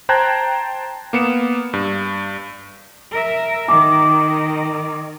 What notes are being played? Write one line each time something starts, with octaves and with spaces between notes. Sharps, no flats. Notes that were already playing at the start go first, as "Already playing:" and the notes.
C5 G5 A5 A#5 F#6 G#6
A#3 B3 C#7 E7
G2
A#4 E5
D#3 D6